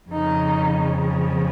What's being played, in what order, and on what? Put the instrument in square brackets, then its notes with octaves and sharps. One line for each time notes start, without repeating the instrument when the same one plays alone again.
[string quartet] F2 C#3 F3 D#4